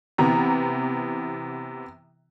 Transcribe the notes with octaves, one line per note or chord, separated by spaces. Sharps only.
C3 E3 B3 A#5